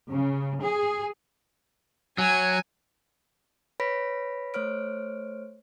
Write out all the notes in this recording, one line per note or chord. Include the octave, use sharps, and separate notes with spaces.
C#3
G#4
F#3 G#5
B4 C#5 B5 A#6 B6 D7
A3 C5 C#5 F6 D7